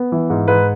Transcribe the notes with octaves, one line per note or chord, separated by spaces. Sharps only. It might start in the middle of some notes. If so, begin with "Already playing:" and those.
Already playing: B3
E3
G#2
G#2 B4